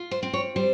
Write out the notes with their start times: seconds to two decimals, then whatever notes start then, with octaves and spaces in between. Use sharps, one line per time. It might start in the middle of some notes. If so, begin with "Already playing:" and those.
Already playing: F4
0.11 C5
0.23 C4
0.33 C#5
0.56 G3 C5